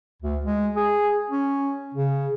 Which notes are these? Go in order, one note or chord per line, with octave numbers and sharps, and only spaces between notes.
D2
G#3
G#4
C#4
C#3